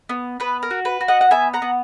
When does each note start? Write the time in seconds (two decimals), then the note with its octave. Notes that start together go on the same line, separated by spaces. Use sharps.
0.09 B3
0.40 B3 B4
0.63 A#4
0.71 F#4
0.85 B4
1.01 F#4
1.08 D#5 F#5
1.21 F#5
1.31 B3 E5 G#5
1.54 F#5 A#5
1.62 B3